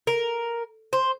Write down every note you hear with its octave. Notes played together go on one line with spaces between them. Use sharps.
A#4
C5